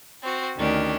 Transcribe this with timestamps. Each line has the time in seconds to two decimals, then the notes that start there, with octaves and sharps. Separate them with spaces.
0.22 C4 F#4
0.56 D2 D#3 C#4 D4 G4